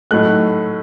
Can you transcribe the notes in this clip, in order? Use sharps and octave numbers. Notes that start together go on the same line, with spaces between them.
A2 F#3 A3 D#4 F#6